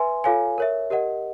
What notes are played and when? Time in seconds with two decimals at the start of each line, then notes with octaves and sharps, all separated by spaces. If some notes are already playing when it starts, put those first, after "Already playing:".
Already playing: B4 E5 G#5 C6
0.24 F4 A4 C#5 F5 G#5
0.58 A#4 C#5 E5
0.90 G4 A#4 D#5 F#5